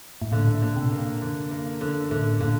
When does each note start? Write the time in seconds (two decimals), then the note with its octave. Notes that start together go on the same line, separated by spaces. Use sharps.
0.22 A2
0.32 A#2 D3
0.47 A2
0.62 A#2 D3
0.76 C3
0.92 A#3
1.22 D3
1.51 A#3
1.81 D3
2.11 A2 D3
2.41 A#2 D3